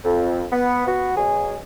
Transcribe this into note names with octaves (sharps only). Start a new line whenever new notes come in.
F2
B3
B3 F#4
B2 F#3 G#4 G#5